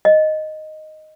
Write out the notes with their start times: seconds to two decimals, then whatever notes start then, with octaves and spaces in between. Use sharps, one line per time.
0.05 D#5